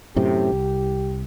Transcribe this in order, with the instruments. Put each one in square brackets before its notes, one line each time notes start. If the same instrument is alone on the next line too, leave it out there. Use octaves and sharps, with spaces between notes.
[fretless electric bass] F#2 A2 C3 [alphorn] G4
[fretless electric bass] C2